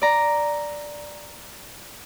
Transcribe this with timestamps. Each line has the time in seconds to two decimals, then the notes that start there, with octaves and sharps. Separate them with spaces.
0.01 D5 A#5